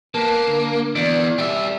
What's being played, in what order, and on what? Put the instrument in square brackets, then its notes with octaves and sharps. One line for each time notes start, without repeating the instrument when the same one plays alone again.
[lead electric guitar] A#3 [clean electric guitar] B4 A5
[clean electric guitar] D3
[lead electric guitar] E2 [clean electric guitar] D5
[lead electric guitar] G3 E5